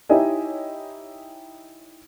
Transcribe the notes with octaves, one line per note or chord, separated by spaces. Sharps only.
D#4 E4 G4 C#5 D#5 G#5